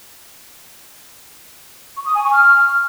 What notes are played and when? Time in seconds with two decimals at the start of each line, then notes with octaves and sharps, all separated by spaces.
1.97 C#6
2.06 D#6
2.15 G#5
2.24 C#6
2.33 F6